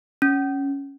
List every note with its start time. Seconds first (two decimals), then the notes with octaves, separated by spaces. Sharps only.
0.22 C#4